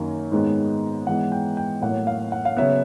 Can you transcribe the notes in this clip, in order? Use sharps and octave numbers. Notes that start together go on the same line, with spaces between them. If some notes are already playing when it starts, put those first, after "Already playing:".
Already playing: F#2 D#3 F#3 A#3
G#2 D#3 G#3 B3
G#2 E3 G#3 B3 F#5
G5
G5
A2 F#3 A#3 F#5
F5
F#5
F5
C#3 F#3 B3 E5